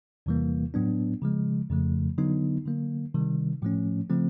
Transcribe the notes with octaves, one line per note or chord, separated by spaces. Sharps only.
E2 C3 E3 G3 A#3
A2 F#3 B3 D4
C#3 F3 G#3
F2 C#3 F3 A3
D3 F#3 B3 D#4
D3 F#3 A#3
C3 D#3 G3
A2 F3 A3 C#4
C#3 F3 A3 C4